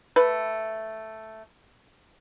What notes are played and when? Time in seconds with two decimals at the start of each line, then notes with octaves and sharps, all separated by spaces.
0.16 A3 B4